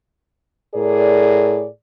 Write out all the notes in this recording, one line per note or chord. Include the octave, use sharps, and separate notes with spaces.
A2 G#4 A#4 D5